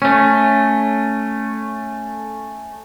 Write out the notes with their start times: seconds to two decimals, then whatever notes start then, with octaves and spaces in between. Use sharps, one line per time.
0.02 A3 C#4